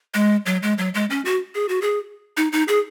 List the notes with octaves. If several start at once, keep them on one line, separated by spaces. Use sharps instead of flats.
G#3
F#3
G#3
F#3
G#3
C#4
F#4
G#4
F#4
G#4
D#4
D#4
G#4